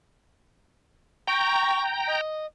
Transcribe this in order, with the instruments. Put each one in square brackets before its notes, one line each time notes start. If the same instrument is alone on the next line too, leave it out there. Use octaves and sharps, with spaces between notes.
[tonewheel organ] G5 A#5 [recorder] C#6
[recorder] D#5